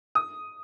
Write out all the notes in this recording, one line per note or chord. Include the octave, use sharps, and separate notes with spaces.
D#6